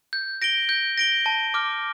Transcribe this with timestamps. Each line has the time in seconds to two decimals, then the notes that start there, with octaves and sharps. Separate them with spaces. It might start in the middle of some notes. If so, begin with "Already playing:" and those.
0.13 G6
0.42 A#6 D7 G7
0.69 G6
0.98 A#6 D7 G7
1.26 A5
1.54 D6 F6